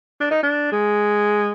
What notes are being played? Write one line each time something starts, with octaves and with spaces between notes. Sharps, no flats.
D4
D#4
D4
G#3